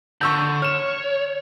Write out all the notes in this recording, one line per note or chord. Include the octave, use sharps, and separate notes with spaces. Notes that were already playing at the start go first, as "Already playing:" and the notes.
D3 C#6 E6 G6
C#5 F6 E7